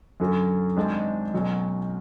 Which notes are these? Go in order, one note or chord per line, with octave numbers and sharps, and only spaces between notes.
F#2 D3 F#3 C#4
G#1 G#2 G#3 D4 G#4
B1 B2 F#3 C#4